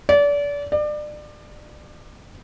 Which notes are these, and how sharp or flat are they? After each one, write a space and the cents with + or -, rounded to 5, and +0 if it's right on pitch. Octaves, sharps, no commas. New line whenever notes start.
D5 -30
D5 +30